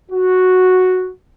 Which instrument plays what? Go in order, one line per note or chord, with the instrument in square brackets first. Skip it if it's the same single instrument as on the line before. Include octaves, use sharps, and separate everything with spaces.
[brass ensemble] F#4